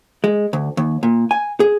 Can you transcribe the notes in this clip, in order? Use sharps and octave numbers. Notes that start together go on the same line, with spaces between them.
G#3
D2
D#2
A#2
G#5
G#4